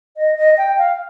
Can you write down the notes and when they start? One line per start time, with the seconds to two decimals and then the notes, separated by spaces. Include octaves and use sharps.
0.17 D#5
0.37 D#5
0.58 G5
0.78 F5